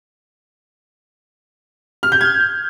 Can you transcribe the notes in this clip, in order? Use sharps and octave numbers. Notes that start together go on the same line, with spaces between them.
F6
G6
G#6